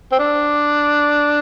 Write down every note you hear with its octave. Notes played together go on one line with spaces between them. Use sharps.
C4
D4